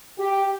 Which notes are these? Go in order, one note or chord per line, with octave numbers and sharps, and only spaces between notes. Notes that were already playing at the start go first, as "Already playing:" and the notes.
G4